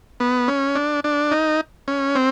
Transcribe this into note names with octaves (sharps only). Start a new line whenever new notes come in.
B3
C#4
D4
D4
D#4
C#4
C4